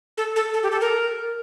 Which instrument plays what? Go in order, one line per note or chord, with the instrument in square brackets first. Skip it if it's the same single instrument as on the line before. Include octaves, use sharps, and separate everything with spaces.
[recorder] A4
A4
A4
G4
A4
A#4